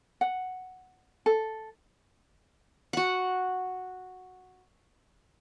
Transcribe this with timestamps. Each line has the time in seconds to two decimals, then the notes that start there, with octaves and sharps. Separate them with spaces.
0.21 F#5
1.26 A4
2.93 F#4 F#5